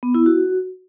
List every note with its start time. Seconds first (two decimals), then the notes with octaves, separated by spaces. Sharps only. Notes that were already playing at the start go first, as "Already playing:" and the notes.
0.03 B3
0.14 E4
0.26 F#4